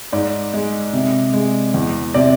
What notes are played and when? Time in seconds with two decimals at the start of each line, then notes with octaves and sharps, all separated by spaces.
0.13 G#2 D5
0.53 G#3
0.93 C3
1.34 G#3
1.74 E2
2.14 C3 D5